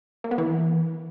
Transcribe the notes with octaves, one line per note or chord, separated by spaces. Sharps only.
A#3
B3
E3